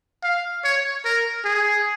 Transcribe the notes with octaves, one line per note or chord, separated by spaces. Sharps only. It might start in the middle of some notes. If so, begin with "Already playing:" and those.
F5
C#5
A#4
G#4